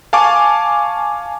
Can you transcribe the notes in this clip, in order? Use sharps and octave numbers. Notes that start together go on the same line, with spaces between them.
F5 G#5 A5 C#6 D6